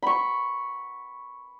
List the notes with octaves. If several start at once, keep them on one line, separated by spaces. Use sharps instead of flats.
B5 C#6